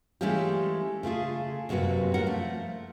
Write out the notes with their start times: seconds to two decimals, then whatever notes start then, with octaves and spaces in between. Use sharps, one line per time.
0.21 E3 G#3 A3 C#4 F4 G4
1.03 C#3 A3 F4 G#4
1.69 F#2 C3 A#3 F#4 B4
2.14 C#4 F4 A#4 F#5
2.26 F3 A3